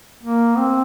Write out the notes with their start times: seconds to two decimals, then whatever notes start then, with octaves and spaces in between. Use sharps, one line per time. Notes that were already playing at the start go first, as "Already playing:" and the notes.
0.23 A#3
0.58 C4